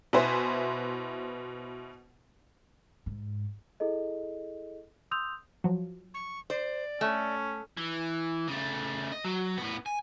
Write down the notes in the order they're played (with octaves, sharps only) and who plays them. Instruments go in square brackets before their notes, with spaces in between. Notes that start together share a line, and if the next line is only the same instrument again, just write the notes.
[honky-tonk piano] B2 E4 B4 C5 G#5 B6
[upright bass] G#2
[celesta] E4 G#4 A4 D#5
C6 D#6 E6 G6 F7
[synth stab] F3 F#3
[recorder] C#6
[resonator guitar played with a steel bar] C5 [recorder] D5
[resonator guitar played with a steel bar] A3 [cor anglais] C#4
[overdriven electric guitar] E3
C#3 A3
D#5
F#3
A2 B3
G#5